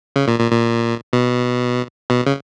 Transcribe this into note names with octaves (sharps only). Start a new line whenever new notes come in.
C#3
A#2
A#2
A#2
B2
B2
C#3